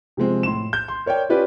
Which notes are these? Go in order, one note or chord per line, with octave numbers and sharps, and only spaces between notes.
C3 F3 G#3 C4
A2 C6 E7
G6
C6
A#4 C#5 D5 G5
C#4 F4 G4 B4 D5